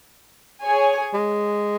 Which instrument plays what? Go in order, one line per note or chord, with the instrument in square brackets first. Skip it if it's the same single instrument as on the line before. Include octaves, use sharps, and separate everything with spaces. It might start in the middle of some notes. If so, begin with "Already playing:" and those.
[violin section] G#4 C#5 G#5
[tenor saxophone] G#3